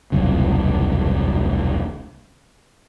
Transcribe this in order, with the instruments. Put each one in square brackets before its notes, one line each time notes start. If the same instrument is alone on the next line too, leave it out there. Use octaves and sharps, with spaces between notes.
[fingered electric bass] E1 C2 F#2 C#3